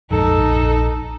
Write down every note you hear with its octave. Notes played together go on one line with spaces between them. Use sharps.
A#1 F2 G#2 D#4 A4
A#1